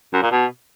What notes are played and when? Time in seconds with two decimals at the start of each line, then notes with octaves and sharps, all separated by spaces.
0.13 F#2
0.22 A#2
0.31 B2